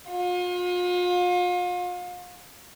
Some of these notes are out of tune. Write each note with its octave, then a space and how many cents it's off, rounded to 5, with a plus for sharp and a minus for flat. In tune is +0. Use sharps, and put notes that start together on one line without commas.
F4 +40